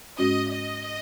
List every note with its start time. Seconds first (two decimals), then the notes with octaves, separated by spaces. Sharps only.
0.18 G#2 G#3 C#4 F#4 D#5
0.52 D#5